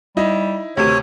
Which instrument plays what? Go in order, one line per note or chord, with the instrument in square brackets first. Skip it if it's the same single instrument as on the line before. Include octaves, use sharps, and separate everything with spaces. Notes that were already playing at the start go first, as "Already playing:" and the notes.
[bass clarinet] G3 [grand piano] D#4 E4 D#5
[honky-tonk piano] D2 C3 D#7 [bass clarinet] D#3 [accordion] C#5